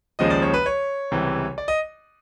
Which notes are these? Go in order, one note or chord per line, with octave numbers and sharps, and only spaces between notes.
D#2 C#3 F3 G#3 D#5
D5
C#5
B4
C#5
C#2 C3 E3 G3
D5
D#5